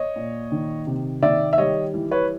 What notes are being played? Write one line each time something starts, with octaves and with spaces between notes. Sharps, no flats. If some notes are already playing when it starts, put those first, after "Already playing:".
Already playing: C#5 D#5
A#2
D#3
C3
D#3 D5 E5
E5
G3 C#5 D#5
E3
B4 C#5